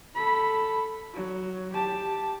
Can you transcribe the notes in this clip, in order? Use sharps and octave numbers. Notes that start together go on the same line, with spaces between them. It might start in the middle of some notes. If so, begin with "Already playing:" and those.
A4 B5
F#3
G4 A5